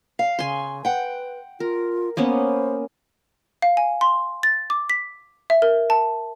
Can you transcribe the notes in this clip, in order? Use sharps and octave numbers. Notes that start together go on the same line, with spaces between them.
F5
C#3 G#5 C6
B4 F#5 G5
F4 A#4
A#3 B3 C#4 C5
F5
G#5
C6
A6
D6
B6
E5
A#4
A5